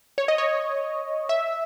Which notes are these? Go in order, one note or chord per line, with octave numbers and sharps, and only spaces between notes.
C#5
D#5
C#5
E5